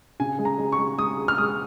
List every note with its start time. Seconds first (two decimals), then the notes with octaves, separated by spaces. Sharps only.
0.20 C#3 G#5
0.39 G#3
0.45 A#5
0.58 G#3
0.72 C#6
0.78 G#3
0.98 G#3 D#6
1.18 G#3
1.28 F6
1.38 G#3 D#6